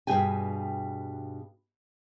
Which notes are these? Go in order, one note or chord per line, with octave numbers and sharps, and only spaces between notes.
G2 B2 F#3 G#4 G5 G#5